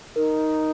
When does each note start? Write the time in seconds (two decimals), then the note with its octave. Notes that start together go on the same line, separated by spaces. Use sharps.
0.16 D#4 A#4